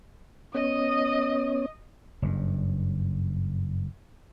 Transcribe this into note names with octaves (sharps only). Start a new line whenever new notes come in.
B3 C#4 C#5 D#5 D#6
F#1 G2